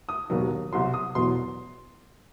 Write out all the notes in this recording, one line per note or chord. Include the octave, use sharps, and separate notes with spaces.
D#6
E1 D#2 D#3 F#3
C2 B2 F#3 C6
D#6
E1 E2 B2 F#3 C6